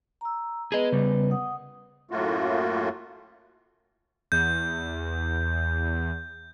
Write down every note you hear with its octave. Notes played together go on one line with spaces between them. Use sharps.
A#5 E6
B3 G#4 B4 D#5
C#3 G3
F#5 D#6
F#2 A2 A3 A#3 F4 F#4
E2 G6